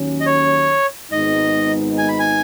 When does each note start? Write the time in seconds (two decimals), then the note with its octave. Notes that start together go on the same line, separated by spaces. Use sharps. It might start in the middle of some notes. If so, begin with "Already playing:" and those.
Already playing: D#2 D#3 F#3 C#4
0.21 D#5
0.26 C#5
1.12 G#1 G#2 G#3 B3 D#4 D#5
1.98 G#5
2.08 B5
2.19 G#5